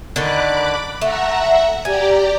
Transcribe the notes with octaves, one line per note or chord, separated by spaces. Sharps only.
D3 D#3 B5 D6 F#6
A3 E5 F#5 A#5
G4 D5 G#5 A#5